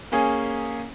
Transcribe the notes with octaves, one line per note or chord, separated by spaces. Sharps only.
A#3 C#4 G#4 G#5